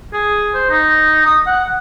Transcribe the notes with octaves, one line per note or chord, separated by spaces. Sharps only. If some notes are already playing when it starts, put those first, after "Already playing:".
G#4
C5
D#4
D#6
F#5